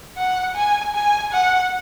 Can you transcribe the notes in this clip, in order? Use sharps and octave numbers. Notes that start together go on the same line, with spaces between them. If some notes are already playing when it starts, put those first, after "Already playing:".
F#5
G#5
G#5
F#5